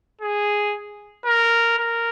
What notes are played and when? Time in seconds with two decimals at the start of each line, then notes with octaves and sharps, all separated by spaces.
0.21 G#4
1.26 A#4
1.78 A#4